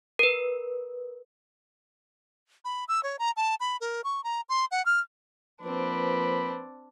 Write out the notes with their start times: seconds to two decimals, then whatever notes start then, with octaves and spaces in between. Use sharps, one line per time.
0.19 A#4 B4
2.65 B5
2.88 E6
3.03 C#5
3.19 A#5
3.37 A5
3.60 B5
3.81 A#4
4.04 C#6
4.24 A#5
4.49 C6
4.71 F#5
4.86 F6
5.62 F3 A#3 C4 D4 B4 B5